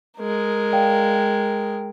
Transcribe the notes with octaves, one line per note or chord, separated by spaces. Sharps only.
G#3 A#4
D5 F5 G5
G5